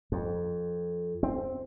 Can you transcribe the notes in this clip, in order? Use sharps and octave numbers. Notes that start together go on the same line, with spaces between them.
F2
C4